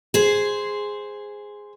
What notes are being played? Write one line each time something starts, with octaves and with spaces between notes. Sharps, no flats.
G#4 C5